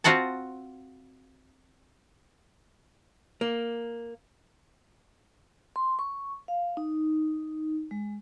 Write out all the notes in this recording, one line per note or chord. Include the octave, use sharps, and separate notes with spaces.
C4 F4 F#4 F#5 A5
A#3
C6
C#6
F5
D#4
G#3